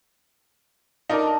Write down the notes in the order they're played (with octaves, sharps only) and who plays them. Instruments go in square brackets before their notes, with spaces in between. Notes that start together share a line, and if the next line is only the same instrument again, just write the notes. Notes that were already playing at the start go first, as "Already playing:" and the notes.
[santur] A3 D4 [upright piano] D#4 A#4 D5